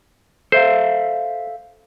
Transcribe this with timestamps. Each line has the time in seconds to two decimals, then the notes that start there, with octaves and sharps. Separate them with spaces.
0.52 A4 C5 E5 F5